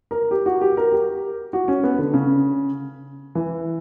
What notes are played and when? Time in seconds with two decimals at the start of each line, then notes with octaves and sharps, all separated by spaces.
0.11 A#4
0.31 G4
0.46 F#4
0.61 G4
0.77 A#4
0.92 G4
1.53 F#4
1.68 C#4
1.84 B3
1.99 D3
2.14 C#3
3.35 E3